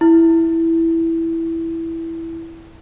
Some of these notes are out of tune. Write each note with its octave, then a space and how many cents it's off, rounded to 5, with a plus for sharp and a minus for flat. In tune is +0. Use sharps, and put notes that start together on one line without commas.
E4 +0